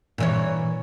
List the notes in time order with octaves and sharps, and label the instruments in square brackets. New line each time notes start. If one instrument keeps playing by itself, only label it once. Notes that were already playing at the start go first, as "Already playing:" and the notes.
[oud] A#2 E3 C#5